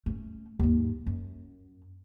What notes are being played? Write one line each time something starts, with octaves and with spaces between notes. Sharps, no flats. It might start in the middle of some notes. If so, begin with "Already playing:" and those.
A3 C#4
D#2 G#2
F#2